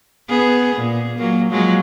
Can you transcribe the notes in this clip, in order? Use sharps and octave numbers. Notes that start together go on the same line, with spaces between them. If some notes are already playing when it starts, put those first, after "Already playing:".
B3 G#4
A#2
F#3 A#3
F3 F#3 G#3